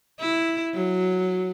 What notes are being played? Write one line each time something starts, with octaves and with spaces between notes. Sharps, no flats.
E4
F#3